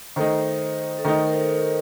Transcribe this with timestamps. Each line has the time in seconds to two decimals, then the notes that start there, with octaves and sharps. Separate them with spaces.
0.16 D#3 A3 D#4 C5
0.98 A4
1.04 D#3 A3 D#4 A#4
1.27 A#4
1.33 C5
1.62 A#4